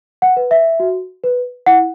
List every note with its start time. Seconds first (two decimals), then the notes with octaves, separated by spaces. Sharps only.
0.22 F#5
0.37 B4
0.51 E5
0.80 F#4
1.24 B4
1.66 E4 F#5